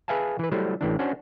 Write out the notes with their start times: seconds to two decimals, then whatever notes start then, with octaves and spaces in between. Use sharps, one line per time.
0.08 G#4 B4 E5 F5 G#5 A5
0.39 E3 B4
0.51 F#3 G3 A3 E4 C5
0.81 A1 A2 E3 D4
0.99 C#4 D4 F#4 C5